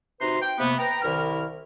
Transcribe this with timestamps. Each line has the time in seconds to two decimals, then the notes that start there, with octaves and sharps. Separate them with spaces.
0.21 C3 D#4 F#4 B4 A#5 C6
0.42 G5
0.59 C3 A#3 B3
0.79 B4 G5 A#5
1.03 C2 D#3 E4 A#4 F6